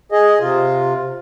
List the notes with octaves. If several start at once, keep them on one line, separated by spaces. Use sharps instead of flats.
G#4 D#5
C3 F4